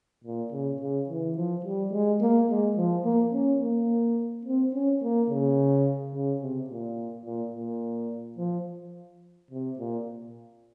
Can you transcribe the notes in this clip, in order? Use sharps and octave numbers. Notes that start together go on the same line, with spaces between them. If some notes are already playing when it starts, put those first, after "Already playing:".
A#2
C#3
C#3
E3
F3
G3
G#3
A#3
G#3
F3
A#3
C#4
A#3
C4
C#4
A#3
C#3
C#3
C3
A#2
A#2
A#2
F3
C3
A#2